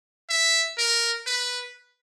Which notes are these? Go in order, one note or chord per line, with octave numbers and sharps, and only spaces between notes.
E5
A#4
B4